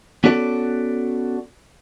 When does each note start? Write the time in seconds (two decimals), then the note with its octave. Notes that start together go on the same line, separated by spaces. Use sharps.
0.24 B3 C#4 F#4 A4 D5